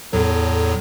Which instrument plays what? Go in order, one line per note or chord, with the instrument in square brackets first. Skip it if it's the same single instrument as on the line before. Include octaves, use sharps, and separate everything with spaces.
[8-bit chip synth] E2 A2 F#3 [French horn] A4